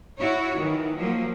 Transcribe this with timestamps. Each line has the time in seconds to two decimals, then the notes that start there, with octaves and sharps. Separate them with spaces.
0.18 E4 F#4 C#5
0.58 D#3 E3
0.95 F3 F#3 A#3